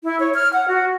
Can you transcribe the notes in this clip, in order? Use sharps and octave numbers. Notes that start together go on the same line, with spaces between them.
E4
C#5
F6
F#5
F#4